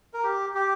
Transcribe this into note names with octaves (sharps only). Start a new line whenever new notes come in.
A#4
G4
G4